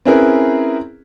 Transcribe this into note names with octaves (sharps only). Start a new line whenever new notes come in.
C4 C#4 E4 G#4 A#4 B4